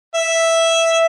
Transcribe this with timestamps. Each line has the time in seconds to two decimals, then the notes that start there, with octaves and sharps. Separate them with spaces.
0.14 E5